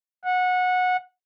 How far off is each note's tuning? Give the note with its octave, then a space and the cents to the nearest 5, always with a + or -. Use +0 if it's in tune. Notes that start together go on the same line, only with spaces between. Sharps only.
F#5 -20